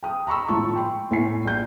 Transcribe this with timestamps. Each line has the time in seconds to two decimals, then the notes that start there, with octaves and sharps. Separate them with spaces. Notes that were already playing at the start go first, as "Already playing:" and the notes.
0.03 G5 D#6
0.27 A#5 B5 C#6 E6
0.48 G#1 A2 F3 A5 C#6
0.75 G5 B5 C6
1.11 A2 G#5 C7
1.45 A#1 G6